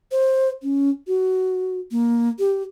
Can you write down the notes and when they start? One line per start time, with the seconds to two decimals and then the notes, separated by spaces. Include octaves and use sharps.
0.12 C5
0.63 C#4
1.07 F#4
1.91 A#3
2.39 G4